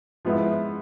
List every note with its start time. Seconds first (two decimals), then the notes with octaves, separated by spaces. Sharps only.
0.25 F3 G#3 B3 E4